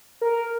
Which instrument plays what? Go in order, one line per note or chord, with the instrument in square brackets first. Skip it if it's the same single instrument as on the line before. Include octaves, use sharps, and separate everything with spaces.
[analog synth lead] A#4